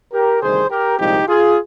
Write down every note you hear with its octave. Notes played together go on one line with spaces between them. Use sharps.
G4 A#4
D2 C3 D#3 G3 G#4 C5
G4 A#4
C2 A#2 F3 G#3 C4 D#4 G4
F4 G#4